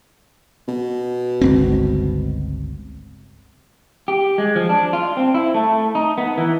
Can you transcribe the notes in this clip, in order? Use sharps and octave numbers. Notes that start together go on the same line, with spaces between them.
B2
G1 C#2 C4
G4
G#3
F3
D4
F4
C4
E4
A3
D#4
B3
E3